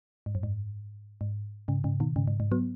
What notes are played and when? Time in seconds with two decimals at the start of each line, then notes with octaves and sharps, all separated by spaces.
0.26 G#2
0.35 F#2
0.43 G#2
1.21 G#2
1.68 G#2 C#3
1.84 G#2 C#3
2.00 B2 D#3
2.16 G#2 C#3
2.28 G#2
2.40 G#2
2.52 F#3 B3